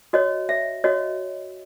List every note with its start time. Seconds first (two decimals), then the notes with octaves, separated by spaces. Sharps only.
0.13 F#4 C#5 D#5
0.49 E5
0.84 F#4 C#5 D#5